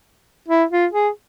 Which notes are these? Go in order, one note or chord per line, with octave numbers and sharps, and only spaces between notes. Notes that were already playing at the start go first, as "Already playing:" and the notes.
E4
F4
G#4